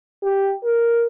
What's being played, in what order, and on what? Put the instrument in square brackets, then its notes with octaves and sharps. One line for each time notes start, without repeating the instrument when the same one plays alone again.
[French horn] G4
A#4